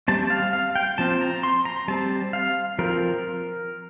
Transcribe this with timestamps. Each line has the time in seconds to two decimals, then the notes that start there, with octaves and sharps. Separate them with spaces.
0.08 G3 C4 A5
0.30 F5
0.53 F5
0.75 G5
0.98 F3 C4 A5
1.21 A#5
1.43 C6
1.65 A#5
1.88 G3 C4 A5
2.33 F5
2.79 F3 C4 A#4